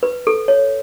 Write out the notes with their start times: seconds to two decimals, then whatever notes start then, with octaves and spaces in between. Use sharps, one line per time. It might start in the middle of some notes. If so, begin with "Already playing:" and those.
0.03 B4
0.27 A4
0.48 C#5